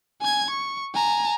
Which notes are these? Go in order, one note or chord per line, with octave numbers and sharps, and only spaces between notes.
G#5 G#6
C#6
G#5 A#5